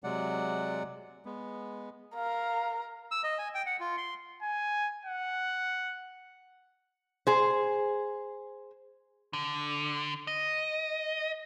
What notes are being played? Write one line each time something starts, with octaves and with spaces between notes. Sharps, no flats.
C3 F#3 G#3 D5 F#5
G#3 B3
A#4 F5
E6
D#5
G#5
G5
F#5
F4
C6
G#5
F#5
G#4 C5
D3
D#5